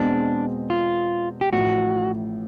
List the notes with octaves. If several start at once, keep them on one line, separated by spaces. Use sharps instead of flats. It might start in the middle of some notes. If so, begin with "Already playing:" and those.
Already playing: E2 B2 G#3 C4 D4
F4
G4
A1 A2 F3 F#4